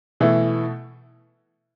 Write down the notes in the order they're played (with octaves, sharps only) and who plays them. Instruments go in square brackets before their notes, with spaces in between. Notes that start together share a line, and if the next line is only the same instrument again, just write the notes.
[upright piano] B2 E3 A3 E4